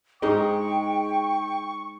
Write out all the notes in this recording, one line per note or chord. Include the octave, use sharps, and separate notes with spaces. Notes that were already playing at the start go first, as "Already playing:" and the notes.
G#2 G#3 D#4 D#5 G5 C#6